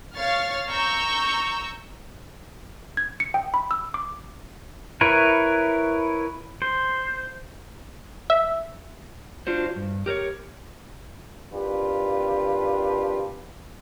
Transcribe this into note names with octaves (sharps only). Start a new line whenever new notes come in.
C#5 F5 C#6 F6 A6
A#5 C#6 E6 G6
G#6
C#7
G5
B5
E6
D6
E4 A#4 B4 C#5
C5
E5
D4 F4 F#4 C5
G2
G4 A#4 C5 C#5
G#1 D4 F4 G4 B4